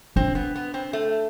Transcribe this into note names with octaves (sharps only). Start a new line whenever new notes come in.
C4 D4
B3
B3
C4
A3